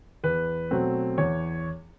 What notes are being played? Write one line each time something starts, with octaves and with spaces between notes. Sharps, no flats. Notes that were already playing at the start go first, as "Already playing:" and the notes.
E2 B4
B2 F#3 A3 C4
E2 C#5